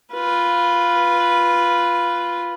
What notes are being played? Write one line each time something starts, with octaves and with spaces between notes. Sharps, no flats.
F4 B4